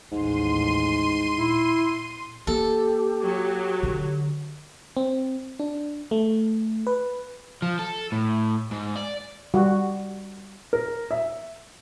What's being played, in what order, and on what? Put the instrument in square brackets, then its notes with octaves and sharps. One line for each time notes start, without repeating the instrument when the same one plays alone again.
[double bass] A1 D#2 [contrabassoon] G#2 [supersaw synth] C6 D#7
[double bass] A#2 [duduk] E4
[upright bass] A#3 [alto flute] G4 [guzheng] A4
[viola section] F#3
[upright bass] D3
[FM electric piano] C4
D4
A3
B4
[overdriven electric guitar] F3
A4
A2
G#2
D5
[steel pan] G3 F#4
[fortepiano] A#4
E5